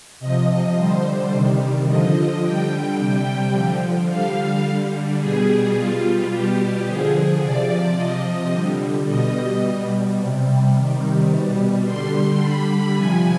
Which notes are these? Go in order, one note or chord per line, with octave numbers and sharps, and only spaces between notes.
C3 F3 D#5
D3 G3 C5
C3 D#3 G3
D3 F3 D#5
D3 G3 G5
C3 G3 G5
D3 F3
D3 G3 F5
D3 G3
B2 G3 G#4
B2 G3 F4
B2 G3 G4
D3 F3 G#4
C3 F3 D5
C3 F3 D#5
D3 G3
B2 G3 D#5
B2 G3
C3 G3
C3 D#3 G3
B2 G3
D3 G3 C6
D3 G3 B5
C3 F3 G#5